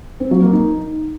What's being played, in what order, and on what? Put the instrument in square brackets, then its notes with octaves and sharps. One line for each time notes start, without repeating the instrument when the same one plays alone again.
[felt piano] C4
F#3
A#3
D#4